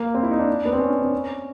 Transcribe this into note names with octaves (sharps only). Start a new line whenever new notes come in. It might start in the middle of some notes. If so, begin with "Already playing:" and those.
Already playing: A#3
C4
E4
D#4
D4
B3
C4
C#4
C#4
C4
C#4